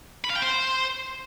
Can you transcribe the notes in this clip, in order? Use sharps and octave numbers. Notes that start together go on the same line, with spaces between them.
B5
F5
G5
C5